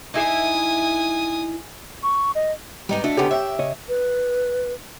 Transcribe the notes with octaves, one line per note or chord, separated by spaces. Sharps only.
D#4 E4 G#4 G#5 D#6
C#6
D#5
G#2 G3 B3 D#4 G4
A3 D4 F#4 D#5
D3 B3 C#4 G4
C#5 E5 F#5 G5
C#3 C#5 D#5
B4